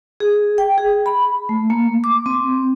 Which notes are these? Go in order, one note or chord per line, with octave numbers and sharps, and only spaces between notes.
G#4
G5
G#4
B5
A3
A#3
D6
C4